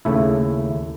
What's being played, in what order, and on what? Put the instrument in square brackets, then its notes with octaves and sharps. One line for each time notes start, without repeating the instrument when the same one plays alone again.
[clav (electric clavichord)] D#2 C#3 A3 E4